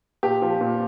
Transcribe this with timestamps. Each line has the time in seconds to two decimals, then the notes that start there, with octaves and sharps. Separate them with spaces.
0.23 A#2 G4
0.42 F3
0.61 A#2